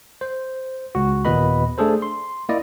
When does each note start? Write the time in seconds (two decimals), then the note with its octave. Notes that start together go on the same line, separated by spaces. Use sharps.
0.21 C5
0.95 C#2 F#4
1.25 D#2 A#2 B3 B4 D#5 B5
1.78 A3 D4 G#4 A4 C5
2.02 C6
2.49 A#3 E4 D5 D#5